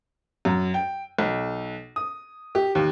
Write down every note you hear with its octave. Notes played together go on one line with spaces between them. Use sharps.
F#2
G5
B1
D#6
G4
D#2